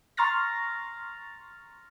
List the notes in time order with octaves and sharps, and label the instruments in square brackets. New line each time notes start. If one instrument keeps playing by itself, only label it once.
[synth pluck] A#5 C6 C#6 F6 A6 A#6